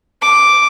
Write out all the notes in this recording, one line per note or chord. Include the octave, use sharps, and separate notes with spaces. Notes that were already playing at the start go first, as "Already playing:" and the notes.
D6